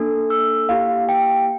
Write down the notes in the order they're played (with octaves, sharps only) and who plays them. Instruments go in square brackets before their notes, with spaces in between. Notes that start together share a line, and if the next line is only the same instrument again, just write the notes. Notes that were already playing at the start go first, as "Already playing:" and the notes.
Already playing: [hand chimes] A#3 D4 A4
E6
A#3 E4 G4 F5
G5